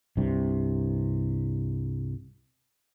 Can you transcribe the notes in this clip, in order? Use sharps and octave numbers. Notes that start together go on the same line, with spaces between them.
C2 G2 C3